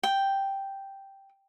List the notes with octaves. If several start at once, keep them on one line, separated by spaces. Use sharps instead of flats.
G5